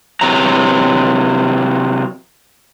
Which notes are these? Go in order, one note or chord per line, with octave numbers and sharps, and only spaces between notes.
C3 E3 F#3 A#5